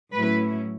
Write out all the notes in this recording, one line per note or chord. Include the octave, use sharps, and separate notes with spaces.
A2 F#3 C#4 E4 B4